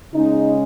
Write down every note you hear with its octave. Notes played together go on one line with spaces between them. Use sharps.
C#3 G#3 D#4